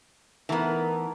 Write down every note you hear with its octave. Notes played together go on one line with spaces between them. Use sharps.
E3 A3 B3 D#4 A#4